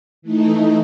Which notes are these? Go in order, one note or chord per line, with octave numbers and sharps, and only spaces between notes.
E3 A3 D#4